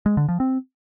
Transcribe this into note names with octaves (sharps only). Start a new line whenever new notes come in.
G#3
D3
F3
C4